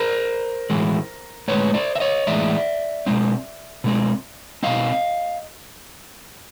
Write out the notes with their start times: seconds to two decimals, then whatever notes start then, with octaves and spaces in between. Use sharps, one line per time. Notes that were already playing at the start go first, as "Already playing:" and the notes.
Already playing: A#4 C5
0.70 A2 E3 G#3
1.48 A2 E3 G#3 B4 C#5
1.74 C5 D5
1.95 E5
2.00 C#5 D#5
2.27 A2 E3 G#3 D5 E5
3.06 B2 G#3 C4
3.84 B2 G#3 C4
4.63 B2 G#3 C4 D#5 F5